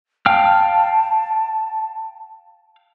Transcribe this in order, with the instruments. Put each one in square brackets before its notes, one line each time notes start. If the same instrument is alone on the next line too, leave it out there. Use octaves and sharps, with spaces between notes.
[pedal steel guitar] F5 G5 F6 [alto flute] A5